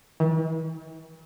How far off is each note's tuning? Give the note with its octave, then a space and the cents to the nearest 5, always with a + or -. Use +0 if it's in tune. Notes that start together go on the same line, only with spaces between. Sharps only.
E3 -45